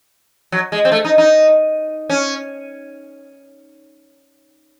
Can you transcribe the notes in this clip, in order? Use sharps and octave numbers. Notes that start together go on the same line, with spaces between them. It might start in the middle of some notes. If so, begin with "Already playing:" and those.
F#3
G#3
C4
A3
D#4
D#4
C#4